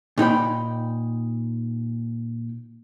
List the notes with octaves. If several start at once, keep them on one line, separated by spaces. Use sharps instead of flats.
A#2 D#4 G5 B5